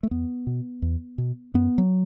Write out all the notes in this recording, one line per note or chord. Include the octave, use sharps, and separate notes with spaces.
A3
E2 B3
B2
E2
B2
F#2 B3
F#3